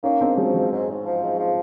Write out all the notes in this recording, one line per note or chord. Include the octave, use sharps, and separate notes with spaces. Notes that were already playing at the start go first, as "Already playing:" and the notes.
A#3 C#4 D#4
G#2 C4 D4
F3 F#3 G#3
G#2 F#3
G#2
G#2
F3
G#2
F3